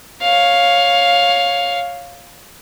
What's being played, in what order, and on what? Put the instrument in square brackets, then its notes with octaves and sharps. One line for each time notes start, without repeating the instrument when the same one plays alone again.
[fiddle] C#5 F5